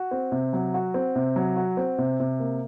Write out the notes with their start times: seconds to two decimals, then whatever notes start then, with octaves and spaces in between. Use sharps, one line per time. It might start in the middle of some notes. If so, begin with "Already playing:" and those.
Already playing: F#4
0.11 C4
0.32 C3
0.53 F#3
0.74 F#4
0.94 C4
1.15 C3
1.36 F#3
1.56 F#4
1.77 C4
1.98 C3
2.20 C3
2.39 A#3